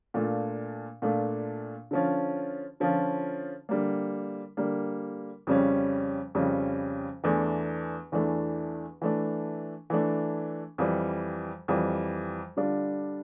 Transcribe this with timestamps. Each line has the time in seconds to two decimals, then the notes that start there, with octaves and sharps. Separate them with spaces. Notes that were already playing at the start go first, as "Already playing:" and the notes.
0.14 A#2 A3 D4 F4
1.02 A#2 A3 D4 F4
1.91 D3 F3 C#4 F4
2.80 D3 F3 C#4 F4
3.69 D3 G3 A#3
4.57 D3 G3 A#3
5.47 F2 C#3 G3 C#4
6.35 F2 C#3 G3 C#4
7.24 E2 E3 A3 D4
8.12 E2 E3 A3 D4
9.02 E3 A3 D4
9.90 E3 A3 D4
10.78 F2 E3 G3
11.68 F2 E3 G3
12.57 D3 G3 D4 F4